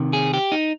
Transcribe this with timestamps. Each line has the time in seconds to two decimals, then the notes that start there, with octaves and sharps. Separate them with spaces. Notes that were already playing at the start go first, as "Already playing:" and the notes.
Already playing: C3 D#3
0.13 G#4
0.34 G4
0.52 D#4